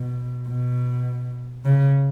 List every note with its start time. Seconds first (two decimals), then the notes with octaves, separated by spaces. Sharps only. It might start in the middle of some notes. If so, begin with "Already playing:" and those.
Already playing: B2
0.47 B2
1.65 C#3